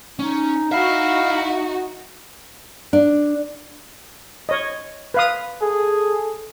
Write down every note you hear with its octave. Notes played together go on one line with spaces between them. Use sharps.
C#4 D#4
D#4 F#4 E5 F5 B5
D4
C#5 D#5
B4 F5 D#6
G#4 A4